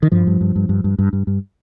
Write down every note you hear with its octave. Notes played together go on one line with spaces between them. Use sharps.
D#3
G2 F3
G2
G2
G2
G2
G2
G2
G2
G2